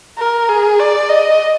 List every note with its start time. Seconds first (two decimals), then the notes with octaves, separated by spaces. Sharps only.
0.18 A#4
0.49 G#4
0.79 D5
1.09 D#5